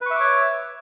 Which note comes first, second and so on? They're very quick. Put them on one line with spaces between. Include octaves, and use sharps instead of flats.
B4 C#6 E5 D6 C#5